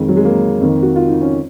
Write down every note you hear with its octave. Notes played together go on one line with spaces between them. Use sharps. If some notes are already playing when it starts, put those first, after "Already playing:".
Already playing: F2 D#3 G#3
F#3
G#3
A#3
F2 D#3
F#4
F4
D#4
C#4